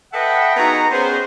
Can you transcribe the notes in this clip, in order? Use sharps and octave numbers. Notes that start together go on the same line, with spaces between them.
A4 B4 D#5 E5 F#5 G5
B3 D#4 F#4 G#4 A#5
B3 C#4 G#4 C5